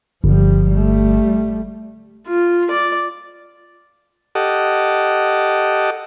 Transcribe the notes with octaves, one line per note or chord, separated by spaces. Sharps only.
G1 F3 G3
G3 A3
F4
D5
G4 A4 D#5 F#5